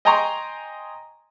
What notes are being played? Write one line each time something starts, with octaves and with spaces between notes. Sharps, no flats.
D#5 G5 G#5 A#5 C6 C#6